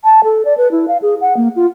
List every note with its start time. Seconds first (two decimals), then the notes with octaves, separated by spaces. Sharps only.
0.04 A5
0.24 A4
0.45 D5
0.57 B4
0.71 E4
0.88 F5
1.02 G#4
1.21 F#5
1.37 A#3
1.56 F4